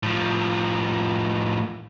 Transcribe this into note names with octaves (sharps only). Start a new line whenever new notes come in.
A2 F3